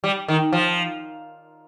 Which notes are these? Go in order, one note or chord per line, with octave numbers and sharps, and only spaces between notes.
G3
D#3
F3